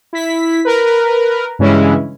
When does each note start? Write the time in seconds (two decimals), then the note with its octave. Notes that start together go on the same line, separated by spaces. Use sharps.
0.13 E4 B6
0.65 A#4 B4
1.59 G2 C#3 E3 G#3 C#4 E4